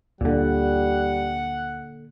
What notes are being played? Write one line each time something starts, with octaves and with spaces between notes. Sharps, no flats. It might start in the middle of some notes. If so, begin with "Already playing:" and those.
D2 A#2 D3 G3 D4 F#5